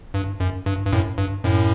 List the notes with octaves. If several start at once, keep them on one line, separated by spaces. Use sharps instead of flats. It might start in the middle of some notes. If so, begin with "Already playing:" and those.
G2
F#2
G2
G2
F#2 A2
G2
F#2 A2